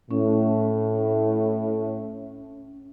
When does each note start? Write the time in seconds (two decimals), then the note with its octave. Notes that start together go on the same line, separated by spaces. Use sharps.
0.11 A2 C#4